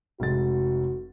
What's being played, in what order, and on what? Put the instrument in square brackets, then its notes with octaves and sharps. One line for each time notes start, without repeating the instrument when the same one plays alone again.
[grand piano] F1 G#3 A6 [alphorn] F#4